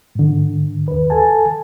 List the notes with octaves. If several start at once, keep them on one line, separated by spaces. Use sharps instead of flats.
G#2 D3
D#2 B4
A4 G#5 A5